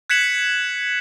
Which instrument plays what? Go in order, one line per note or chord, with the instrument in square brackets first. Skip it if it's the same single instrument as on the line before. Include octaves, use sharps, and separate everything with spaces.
[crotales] F#6 G#6 B6 C#7 E7 F#7